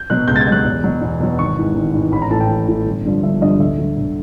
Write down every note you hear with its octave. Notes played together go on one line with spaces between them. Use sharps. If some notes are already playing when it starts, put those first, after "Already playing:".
Already playing: G6
B2 F#3 F#6
C#2 G6
A6
G#6
B2 F#3 F#6 G6
E2
B2 F#3
E2
B2 F#3
G#1 C#6
G#2 E3
G#1
G#2 E3
A1 B5
A#5
A2 E3 A5
G5
A1
A2 E3
G1
G2 D3 F3
G1 E5
G2 D3 F3 D#5
D2 E5
D3 F#3
D2